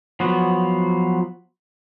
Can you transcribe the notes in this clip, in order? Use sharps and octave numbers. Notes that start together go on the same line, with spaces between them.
F3 F#3 B3 F#4